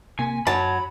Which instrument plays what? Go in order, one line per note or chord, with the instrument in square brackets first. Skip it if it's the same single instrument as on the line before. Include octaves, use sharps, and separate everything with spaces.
[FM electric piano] C3 A#3 [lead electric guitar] G#5
[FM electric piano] F#2 [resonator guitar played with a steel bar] F#3 [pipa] A5 [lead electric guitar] B5